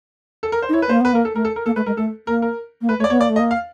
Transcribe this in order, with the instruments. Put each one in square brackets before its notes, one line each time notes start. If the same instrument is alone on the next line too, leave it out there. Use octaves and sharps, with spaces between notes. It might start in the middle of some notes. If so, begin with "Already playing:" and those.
[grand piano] A4
A#4
C5
[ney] D#4
[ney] E4 [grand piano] C#5
[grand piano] B4
[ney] A#3 [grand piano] C5
[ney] B3 [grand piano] B4
[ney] A#3 [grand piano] A#4
[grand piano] A4
[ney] A3 [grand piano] A#4
[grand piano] A4
A#4
[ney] A#3 [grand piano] A4
[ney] A3 [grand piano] B4
[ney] G#3 [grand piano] A#4
[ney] A3 [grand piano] A4
[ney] A#3 [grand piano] A#4
[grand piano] A#4
[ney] A#3
[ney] A3 [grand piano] B4
[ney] A3 [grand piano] C#5
[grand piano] D5
[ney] B3 [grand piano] C#5
[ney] A#3 [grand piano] D5
[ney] A3
[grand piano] D#5
[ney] A#3
[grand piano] F5